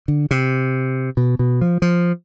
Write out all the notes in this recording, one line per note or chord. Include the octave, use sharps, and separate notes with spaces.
D3
C3
B2
B2
F3
F3